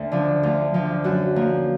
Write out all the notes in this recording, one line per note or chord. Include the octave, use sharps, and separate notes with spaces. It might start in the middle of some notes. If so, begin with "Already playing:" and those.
Already playing: D2
D3 F3 D4
D2 F4
D3 F3
F#2 F#4
F3 A#3